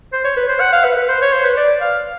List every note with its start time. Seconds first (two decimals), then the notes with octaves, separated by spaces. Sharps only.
0.13 C5
0.24 C#5
0.37 B4
0.49 C5
0.60 F#5
0.72 F5
0.84 B4
0.97 B4
1.09 C5
1.21 C#5
1.32 C5
1.44 B4
1.57 D5
1.81 F5